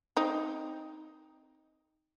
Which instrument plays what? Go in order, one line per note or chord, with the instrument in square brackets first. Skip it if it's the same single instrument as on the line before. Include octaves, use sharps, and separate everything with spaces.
[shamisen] C4 D#4